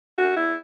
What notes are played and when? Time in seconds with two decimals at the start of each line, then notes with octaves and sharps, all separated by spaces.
0.18 F#4
0.36 E4